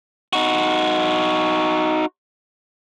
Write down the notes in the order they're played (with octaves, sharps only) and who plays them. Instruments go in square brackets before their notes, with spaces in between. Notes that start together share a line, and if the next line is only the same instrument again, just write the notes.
[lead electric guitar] D#4 F#4